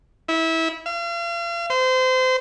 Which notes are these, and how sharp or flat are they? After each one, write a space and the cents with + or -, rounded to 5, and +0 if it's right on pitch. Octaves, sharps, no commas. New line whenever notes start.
E4 -20
F5 -40
C5 -30